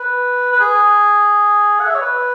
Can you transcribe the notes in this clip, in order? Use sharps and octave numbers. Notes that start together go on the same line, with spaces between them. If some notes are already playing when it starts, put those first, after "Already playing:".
Already playing: B4
B4
G#4
F#5
E5
C#5
B4